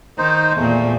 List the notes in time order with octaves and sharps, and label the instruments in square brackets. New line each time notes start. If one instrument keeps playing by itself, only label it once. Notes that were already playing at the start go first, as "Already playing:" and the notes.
[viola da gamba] D#3 [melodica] D#4 C5
[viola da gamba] E2 A#2 [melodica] A3